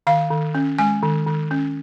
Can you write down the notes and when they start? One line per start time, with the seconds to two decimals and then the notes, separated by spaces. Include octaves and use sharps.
0.07 D#3 F5
0.31 D#3
0.55 C#4
0.78 G#3 G#5
1.03 D#3
1.27 D#3
1.51 C#4